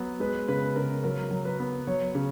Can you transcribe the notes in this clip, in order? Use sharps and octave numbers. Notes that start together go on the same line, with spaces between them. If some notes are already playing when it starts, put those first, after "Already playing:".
Already playing: F#3 B3
G#3 B4
C#3 B4
C#3 A#4
F#3 A#4
F#3
B4
B3
F#3 C#5
C#3